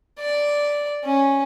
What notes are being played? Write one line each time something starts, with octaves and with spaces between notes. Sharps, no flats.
D5
C#4